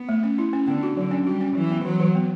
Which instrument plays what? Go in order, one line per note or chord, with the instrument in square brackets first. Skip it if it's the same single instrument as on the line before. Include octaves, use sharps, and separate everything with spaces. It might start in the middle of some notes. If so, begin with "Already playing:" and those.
Already playing: [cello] B3
[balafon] A3
C#4
E4
C#4
[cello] D3 [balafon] B3
[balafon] F#4
[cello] D3 [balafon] F#3
[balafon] C#4
[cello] G3 [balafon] F#4
[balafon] C#4
[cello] E3 [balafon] F#3
[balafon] B3
[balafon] E3 [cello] F#3
[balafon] E3
B3